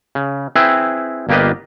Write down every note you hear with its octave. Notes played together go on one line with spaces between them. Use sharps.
C#3
C4 E4 G#4 B4 E5 G5
G1 A#3 F4 G4 B4 D#5